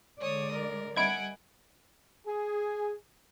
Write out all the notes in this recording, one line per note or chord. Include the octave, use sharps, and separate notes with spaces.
D3 G#3 C#5 D5 D#6
A#4
G3 D#5 E5 F#5 G#5 B5 G#6 D7
G#4